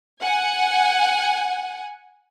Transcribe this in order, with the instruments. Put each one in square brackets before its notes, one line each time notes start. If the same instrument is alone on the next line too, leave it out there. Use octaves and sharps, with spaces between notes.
[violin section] F#5 G#5